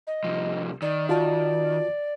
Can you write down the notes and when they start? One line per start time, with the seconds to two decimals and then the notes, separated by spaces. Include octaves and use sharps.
0.07 D#5
0.24 C2 F3
0.82 D#3 D5
1.09 F4 F#4 D5 A5